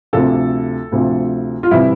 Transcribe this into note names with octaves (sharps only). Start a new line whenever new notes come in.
D2 C3 F3 A4
D2 C3 F3
F4
C3 E3 G3 E4